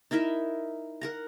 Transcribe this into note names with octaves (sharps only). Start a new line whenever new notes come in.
D#4 E4 A#4 E5
A#4 F#5 A#5